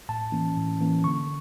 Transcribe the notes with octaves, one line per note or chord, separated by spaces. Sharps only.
A2 A5
E3 A#3 C#4
A2
E3 A#3 C#4
D3 C#6